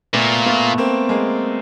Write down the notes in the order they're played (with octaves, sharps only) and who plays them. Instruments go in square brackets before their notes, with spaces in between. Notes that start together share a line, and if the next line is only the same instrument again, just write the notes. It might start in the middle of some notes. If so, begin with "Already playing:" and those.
[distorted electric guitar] A#2 [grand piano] A3 B3
[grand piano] A3 B3
A#3 C4
G#3 A#3